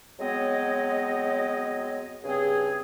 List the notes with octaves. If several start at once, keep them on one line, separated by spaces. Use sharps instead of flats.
F#3 G#3 B3 C4 C#5 D#5
G2 C#3 C4 G#4